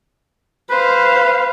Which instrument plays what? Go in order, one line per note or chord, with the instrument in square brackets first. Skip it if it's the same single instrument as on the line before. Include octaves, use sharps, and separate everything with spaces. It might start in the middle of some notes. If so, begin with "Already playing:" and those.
[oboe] B4 [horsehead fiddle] C5 F5